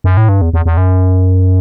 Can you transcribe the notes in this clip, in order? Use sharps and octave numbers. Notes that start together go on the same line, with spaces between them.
F#2
A2
G2
E2
E2
E2
F#2